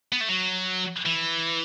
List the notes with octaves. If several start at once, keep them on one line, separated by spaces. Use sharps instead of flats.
B3
A3
F#3
E3